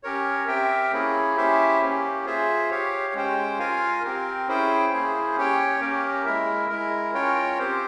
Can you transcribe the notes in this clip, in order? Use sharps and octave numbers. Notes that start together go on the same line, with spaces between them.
C#4 G4 A#4 C#5
C4 G4 A#4 E5 G5
A#3 C#4 E4 G#4
C#4 E4 G4 C5 E5
A#3 C#4 G4
F4 G#4 C5 E5
G4 C#5 F5
G#3 C#4 G4 C5 G5
F4 A#4 F5 G#5
C4 G4 A#4
C#4 E4 G#4 C5 G5
A#3 E4 G#4 C5
C#4 G4 C#5 G5
A#3 C#4 G4 A#4
G#3 E4 A#4 E5
G#3 E4 A#4
C#4 F4 A#4 C#5 G5
C4 G4 C5